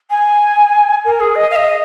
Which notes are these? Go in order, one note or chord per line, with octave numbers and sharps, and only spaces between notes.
G#5
A#4
G#4
D#5
F5
D#5